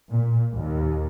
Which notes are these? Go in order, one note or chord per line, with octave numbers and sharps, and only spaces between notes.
A#2
D#2